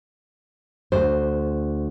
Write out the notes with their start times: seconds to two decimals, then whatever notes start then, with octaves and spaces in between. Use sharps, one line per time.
0.92 D2 C5